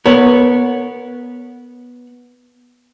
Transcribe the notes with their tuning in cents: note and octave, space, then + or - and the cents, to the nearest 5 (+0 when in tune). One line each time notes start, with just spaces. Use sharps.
B3 -10 A#4 -35 C#5 +0